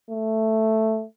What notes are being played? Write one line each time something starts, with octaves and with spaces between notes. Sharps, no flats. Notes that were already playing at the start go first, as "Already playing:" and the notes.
A3